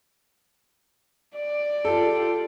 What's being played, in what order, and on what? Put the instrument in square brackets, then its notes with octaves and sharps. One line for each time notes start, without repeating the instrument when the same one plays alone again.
[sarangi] D5
[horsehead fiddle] F4 G4 [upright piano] A4